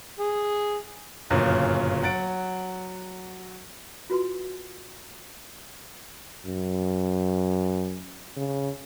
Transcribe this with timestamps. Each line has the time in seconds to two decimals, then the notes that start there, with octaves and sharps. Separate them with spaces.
0.19 G#4
1.30 G1 F#2 A#2 C#3
2.03 F#3 F#5 A6 D7
4.10 F4 F#4 B4 C6
6.46 F#2
8.37 C#3